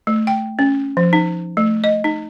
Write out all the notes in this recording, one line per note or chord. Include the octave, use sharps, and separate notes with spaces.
A3
G5
C#4
F3
D#4
A3
D#5
D#4